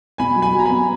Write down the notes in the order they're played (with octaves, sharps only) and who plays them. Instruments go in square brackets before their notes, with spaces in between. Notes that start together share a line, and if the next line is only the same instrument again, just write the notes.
[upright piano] B2 [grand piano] G#5 B5
[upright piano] F#3
[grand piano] G#5 B5
[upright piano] F#3
[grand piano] A#5
G#5 B5
[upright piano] B3